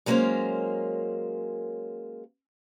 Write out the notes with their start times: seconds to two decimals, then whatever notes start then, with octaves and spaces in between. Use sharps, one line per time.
0.06 F#3 G#3 A#3 C#4 A#4 C5